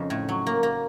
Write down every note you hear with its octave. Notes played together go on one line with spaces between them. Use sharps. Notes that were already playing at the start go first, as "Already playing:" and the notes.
Already playing: F2 C#3 D#4
A2
F#3
A#3
A#3